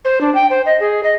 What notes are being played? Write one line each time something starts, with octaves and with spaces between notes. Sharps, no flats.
C5
D4
G5
C5
D#5
G#4
D#5